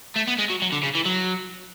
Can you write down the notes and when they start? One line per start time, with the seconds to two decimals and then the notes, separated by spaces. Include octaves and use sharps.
0.16 A3
0.28 B3
0.39 G#3
0.50 F#3
0.62 F#3
0.72 D3
0.83 C#3
0.95 E3
1.06 F#3